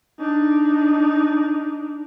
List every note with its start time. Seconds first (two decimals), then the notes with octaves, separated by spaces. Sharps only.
0.20 D4 D#4